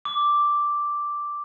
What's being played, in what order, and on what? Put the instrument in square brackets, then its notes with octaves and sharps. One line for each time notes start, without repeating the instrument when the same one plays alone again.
[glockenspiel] D6